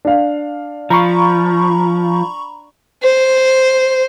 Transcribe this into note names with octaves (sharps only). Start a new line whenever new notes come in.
D4 F5
F3 A#5 B5 C#6
C5